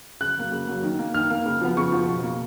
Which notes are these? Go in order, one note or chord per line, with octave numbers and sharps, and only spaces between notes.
C#3 F#6
F#3 A#3
C#3
F#3 A#3
D#3
A#3
D#3 F6
A#3
C#3
F3 B3
C#3 C#6
F3 B3
B2
A#3